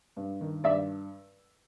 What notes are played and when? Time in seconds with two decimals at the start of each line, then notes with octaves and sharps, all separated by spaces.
0.17 G2
0.41 D#3
0.64 G2 D5 E5